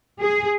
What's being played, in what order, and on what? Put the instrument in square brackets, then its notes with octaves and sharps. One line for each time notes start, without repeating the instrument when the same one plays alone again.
[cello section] G#4